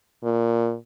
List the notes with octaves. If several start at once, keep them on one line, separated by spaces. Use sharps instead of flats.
A#2